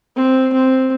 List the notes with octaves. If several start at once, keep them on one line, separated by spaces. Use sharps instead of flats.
C4
C4